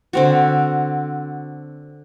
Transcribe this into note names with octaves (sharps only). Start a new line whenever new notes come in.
D3 C4 F#4